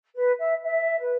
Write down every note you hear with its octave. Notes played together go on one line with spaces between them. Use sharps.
B4
E5
E5
B4